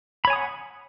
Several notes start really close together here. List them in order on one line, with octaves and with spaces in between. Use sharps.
B5 C#5 G#5 D#6 F#5